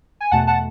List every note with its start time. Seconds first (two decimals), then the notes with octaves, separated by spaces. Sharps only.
0.21 G#5
0.31 E2 B2 A3 F#5 A5
0.47 F#5 A5